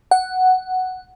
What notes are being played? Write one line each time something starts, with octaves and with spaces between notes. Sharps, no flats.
F#5